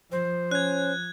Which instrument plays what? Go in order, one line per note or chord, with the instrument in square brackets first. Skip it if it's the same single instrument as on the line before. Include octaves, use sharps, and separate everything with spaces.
[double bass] F3 [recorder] C5
[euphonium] C#4 [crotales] F#6 G#6